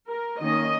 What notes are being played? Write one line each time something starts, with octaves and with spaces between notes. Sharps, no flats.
A#4
D#3 A#3 C#4 D#5